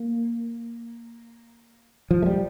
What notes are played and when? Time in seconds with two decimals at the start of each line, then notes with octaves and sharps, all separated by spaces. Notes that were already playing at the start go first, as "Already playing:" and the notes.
Already playing: A#3
2.11 F3
2.22 A3
2.26 G3